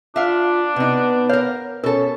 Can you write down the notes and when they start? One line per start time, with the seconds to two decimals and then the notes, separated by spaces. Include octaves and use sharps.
0.16 D4 F4 E5 F5
0.76 C3 B3 D#4
1.29 A#4 C#5 F5
1.84 B2 C#4 A4 A#4